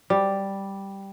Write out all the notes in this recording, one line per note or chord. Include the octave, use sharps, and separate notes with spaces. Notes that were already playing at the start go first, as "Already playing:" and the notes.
G3